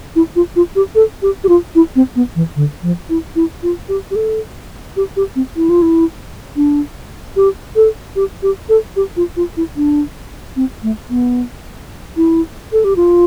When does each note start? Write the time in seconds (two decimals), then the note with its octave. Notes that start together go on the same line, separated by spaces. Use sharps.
0.16 E4
0.36 F4
0.56 F4
0.76 G4
0.95 A4
1.22 G4
1.44 G4
1.49 F4
1.75 E4
1.96 C4
2.16 B3
2.35 E3
2.56 D3
2.83 F3
3.09 E4
3.36 E4
3.63 F4
3.89 G4
4.11 G4
4.16 A4
4.96 G4
5.16 G4
5.36 C4
5.56 E4
5.69 F4
5.82 E4
6.56 D4
7.36 G4
7.76 A4
8.16 G4
8.43 G4
8.69 A4
8.96 G4
9.17 F4
9.36 F4
9.57 E4
9.77 D4
10.56 C4
10.83 A3
11.10 B3
12.17 E4
12.73 A4
12.84 G4
12.96 F4